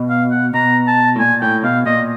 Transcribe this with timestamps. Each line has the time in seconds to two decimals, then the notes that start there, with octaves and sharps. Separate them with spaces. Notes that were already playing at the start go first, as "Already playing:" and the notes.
Already playing: B2
0.09 F5
0.31 F#5
0.54 B2 A#5
0.87 A5
1.16 A2
1.19 A#2 G#5
1.42 A2 G5
1.64 B2 F5
1.86 A#2 D#5